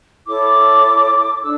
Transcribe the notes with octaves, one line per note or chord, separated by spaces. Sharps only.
E4 A4 C#5 D6
D4 A4 E6